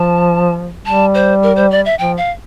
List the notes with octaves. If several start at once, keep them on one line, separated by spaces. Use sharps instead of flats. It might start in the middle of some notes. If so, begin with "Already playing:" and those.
Already playing: F3 A5
G3 A5
C5
A#4
C5
D5
E5
F3 G5
F5